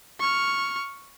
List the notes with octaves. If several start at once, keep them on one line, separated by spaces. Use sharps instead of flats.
C#6 F6